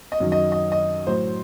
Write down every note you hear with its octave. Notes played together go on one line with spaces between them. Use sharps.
D#5
F#2 D#3 F#3
D#5
D#5
D#5
A2 F#3 C5